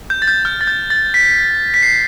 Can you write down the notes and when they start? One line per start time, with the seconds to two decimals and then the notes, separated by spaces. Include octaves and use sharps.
0.10 G6
0.22 A6
0.27 G6
0.45 F6
0.61 A6
0.67 G6
0.90 A6
1.14 B6
1.74 B6
1.83 C7